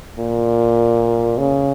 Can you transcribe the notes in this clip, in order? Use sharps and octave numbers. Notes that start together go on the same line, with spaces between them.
A#2
C#3